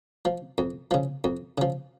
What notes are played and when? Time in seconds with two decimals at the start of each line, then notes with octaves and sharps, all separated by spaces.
0.25 F3
0.58 F2
0.91 C#3 F3
1.24 F2
1.58 C#3 F3